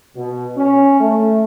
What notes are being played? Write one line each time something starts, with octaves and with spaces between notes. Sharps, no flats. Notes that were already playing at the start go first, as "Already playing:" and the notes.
B2
C#4
A3